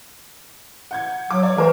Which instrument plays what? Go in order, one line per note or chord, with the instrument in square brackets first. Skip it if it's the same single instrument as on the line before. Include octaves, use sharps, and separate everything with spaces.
[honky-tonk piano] F#5 G6 G#6
[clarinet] F#3 [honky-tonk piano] D6
[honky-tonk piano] C#5 D5
[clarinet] E3 [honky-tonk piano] A3 A#4 C5